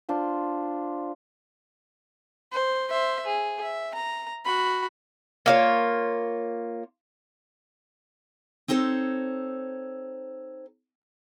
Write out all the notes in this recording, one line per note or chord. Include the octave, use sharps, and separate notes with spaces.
D4 F4 C5
C5
C5 E5
G#4
E5
A#5
F#4 B5
A#3 F4 C#5
C4 D#4 A4 C5 C#5